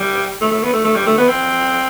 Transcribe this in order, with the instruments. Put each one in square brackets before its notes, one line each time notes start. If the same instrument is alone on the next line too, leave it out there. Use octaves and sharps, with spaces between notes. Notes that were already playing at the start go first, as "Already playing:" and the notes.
Already playing: [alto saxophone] G3
A3
A3
B3
A3
A3
G3
A3
B3
C4